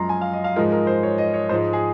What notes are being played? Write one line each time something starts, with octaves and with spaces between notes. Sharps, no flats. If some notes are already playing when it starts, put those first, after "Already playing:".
Already playing: F#2 F3 G#3 A#5 C6
G#5
F5
D#5
F5
G#2 F3 G#3 A#4
A#4
C5
C#5
D#5
C#5
G#2 F3 G#3 C5
G#4